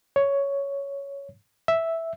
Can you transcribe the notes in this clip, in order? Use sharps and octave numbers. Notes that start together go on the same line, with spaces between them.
C#5
E5